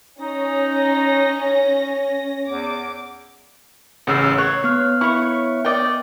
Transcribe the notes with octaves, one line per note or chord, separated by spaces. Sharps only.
C#4 D#4 A#6
E2 D6
A1 C#3 F#5 E6
C#5 F#6
B3 F6
E4 C#5 C#6
D5 D#5 G5